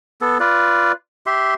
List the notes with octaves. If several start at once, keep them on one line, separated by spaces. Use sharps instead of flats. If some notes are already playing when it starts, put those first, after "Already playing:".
B3 A4
F4 B4 D5
G4 E5 C6